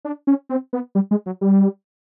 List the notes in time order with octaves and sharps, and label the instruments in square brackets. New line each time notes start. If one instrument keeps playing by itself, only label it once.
[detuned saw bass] D4
C#4
C4
B3
G3
G#3
F#3
G3